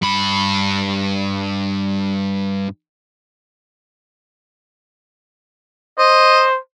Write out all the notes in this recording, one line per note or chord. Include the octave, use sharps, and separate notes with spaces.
G2 B5
C5 D#5